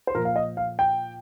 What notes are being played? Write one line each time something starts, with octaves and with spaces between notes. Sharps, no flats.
C5
A#2 F3 A#4
F5
D#5
F5
G5